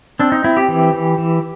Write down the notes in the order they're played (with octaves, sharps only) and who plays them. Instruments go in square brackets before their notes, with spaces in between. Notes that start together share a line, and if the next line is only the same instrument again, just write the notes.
[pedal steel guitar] C4 D4
D#4
C4 E4
G4
E3
E3
E3